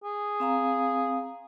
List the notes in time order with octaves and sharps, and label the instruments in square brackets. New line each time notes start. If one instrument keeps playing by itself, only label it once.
[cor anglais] G#4
[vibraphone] C4 F5 A#5